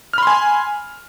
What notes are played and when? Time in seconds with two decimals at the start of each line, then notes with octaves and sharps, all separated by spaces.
0.13 F6
0.18 B5
0.23 C6
0.27 G#5